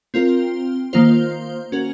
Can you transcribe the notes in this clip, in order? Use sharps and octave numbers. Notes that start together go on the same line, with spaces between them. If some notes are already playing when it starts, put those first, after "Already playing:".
C4 F4 A#4
D#3 A#3 F4 C5
C#4 F#4 A#4